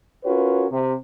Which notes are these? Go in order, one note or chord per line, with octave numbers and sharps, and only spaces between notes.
C#4 F4 F#4 A#4 B4 C#5
C3